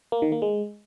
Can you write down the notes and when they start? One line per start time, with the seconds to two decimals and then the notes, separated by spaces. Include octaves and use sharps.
0.12 A#3
0.22 D#3
0.32 A#3
0.42 G#3